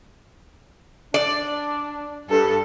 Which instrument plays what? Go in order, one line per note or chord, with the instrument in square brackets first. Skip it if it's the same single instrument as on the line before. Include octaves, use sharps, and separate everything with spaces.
[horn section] D4 [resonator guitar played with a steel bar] D5
[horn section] G2 [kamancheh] A4